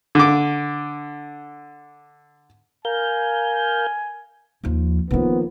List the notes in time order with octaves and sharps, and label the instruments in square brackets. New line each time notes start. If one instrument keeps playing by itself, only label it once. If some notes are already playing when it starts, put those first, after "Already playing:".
[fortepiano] D3 D6
[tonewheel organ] A#4 F5 G6 [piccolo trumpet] G#5
[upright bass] D#2 F3
[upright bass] D#3 C#4 [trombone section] F3 A#3 B3